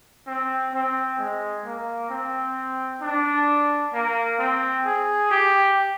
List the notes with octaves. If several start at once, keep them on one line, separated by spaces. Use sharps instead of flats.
C4
C4
G#3
A#3
C4
D4
A#3
C4
G#4
G4